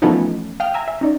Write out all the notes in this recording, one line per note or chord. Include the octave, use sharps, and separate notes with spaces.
E3 F3 A3 B3 C#4 D#4
F5 G5 D#6 F6
E5 G#5 A#5
E5
C#4 D#4 D5